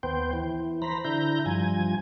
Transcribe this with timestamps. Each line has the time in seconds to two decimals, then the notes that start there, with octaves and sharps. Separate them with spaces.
0.03 D#2 B3 C5 G5
0.33 E3
0.82 C5 A#5 B5
1.05 D3 E4 A#5 G6
1.46 G2 F3 G#5